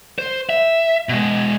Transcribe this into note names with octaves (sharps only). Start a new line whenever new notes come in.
C5
E5
B2 G#3